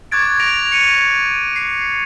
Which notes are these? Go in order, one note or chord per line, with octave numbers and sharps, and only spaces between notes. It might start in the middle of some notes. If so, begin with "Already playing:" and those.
C#6 D6 F#6 G#6 A6 D7
A#6 D7 F7
C#7 D#7
C7